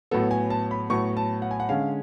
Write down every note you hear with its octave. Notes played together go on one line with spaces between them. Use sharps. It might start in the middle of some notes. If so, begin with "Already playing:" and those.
A2 F#3 B3 A4
G#5
A5
B5
A2 F#3 B3 C#6
A5
F#5
G#5
F#5
D3 G#3 C#4 F5